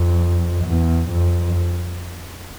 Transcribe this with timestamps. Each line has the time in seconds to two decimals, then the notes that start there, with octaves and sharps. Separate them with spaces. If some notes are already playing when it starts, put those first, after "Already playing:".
Already playing: F2
0.65 E2
1.10 F2